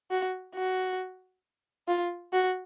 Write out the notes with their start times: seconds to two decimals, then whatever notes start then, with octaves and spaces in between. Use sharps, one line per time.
0.11 F#4
0.55 F#4
1.88 F4
2.33 F#4